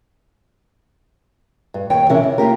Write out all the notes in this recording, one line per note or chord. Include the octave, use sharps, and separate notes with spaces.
G2
D#2 C#5 G5
C3 E3 C#4 E4 A#4
C#3
A#3 F4 G4 A#4